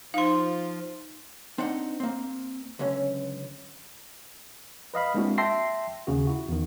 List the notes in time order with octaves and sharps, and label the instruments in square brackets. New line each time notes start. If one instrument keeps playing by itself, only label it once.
[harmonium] F3 F4 [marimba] D#4 [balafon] F5 C6
[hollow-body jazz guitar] C4 D4 D#4 F#5
A#3 C4
C#2 F#2 D3 C#4
[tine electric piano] B4 D#5 F5 B5
G#3 A#3 C4 D4 E4 F#4
E5 G5 A5 C6 A#6 C7
D#2 C#3 F#4
E4 F#4
E2 D#3